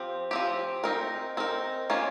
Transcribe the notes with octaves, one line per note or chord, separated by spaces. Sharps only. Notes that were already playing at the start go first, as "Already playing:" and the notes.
Already playing: F3 C4 G4
F3 C4 G4
C4 D#4 A#4
C4 D#4 A#4
D#3 A#3 C#4 F4